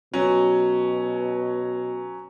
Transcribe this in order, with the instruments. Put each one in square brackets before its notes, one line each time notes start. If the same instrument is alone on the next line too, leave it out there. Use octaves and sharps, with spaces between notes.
[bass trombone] B2 [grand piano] F#3 C#4